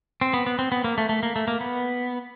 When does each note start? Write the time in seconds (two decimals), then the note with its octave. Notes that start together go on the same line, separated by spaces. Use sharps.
0.21 C4
0.34 B3
0.47 B3
0.59 C4
0.72 B3
0.84 A#3
0.98 A3
1.09 A3
1.23 A#3
1.36 A3
1.48 A#3
1.61 B3